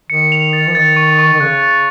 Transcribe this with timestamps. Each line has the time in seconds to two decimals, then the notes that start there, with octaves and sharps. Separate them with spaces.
0.10 D#3 C#7
0.32 F7
0.53 A6
0.67 F3
0.75 D#3 A6
0.96 C#6
1.19 C#6
1.33 D#3
1.40 C#3 F#6
1.62 A6